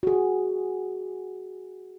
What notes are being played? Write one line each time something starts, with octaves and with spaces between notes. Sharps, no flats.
F#4 G#4